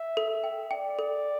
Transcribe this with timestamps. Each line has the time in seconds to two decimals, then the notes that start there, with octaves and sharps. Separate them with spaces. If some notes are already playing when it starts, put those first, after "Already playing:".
Already playing: E5
0.17 A4
0.30 E5
0.44 G5
0.71 D5 G5
0.99 A4